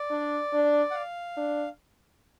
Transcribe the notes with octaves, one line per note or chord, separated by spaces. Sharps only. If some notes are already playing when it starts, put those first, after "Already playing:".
Already playing: D5
D4
D4
F#5
F5
D4